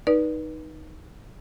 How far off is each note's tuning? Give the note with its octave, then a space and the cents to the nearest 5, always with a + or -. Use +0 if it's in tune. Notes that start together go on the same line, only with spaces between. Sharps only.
D#4 +0 B4 -30 D5 +0